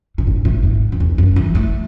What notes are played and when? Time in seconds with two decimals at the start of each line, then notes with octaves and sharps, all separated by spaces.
0.18 A2
0.27 G#2
0.45 A2
0.63 G#2
0.92 F#2
1.00 E2
1.18 F#2
1.36 E3
1.55 A3